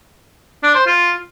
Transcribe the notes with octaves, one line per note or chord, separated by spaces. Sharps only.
D4
C5
F4